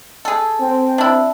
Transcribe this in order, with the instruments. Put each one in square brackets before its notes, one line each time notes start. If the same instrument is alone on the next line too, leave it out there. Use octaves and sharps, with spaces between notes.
[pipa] G#4 A4
[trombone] C4
[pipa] D4 E4